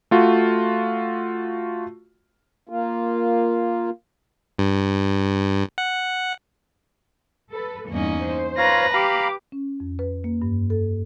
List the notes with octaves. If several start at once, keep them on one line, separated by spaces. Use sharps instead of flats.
A3 F4 F#4
A#3 F4
G2
F#5
A4 B4
E2 G2 A#3 C#4 D#4
C5
F4 B4 C#5 F5 A#5 A#6
G4 F5 A#5 B5 D6
C#4
F2
B4
A#3
G2
A4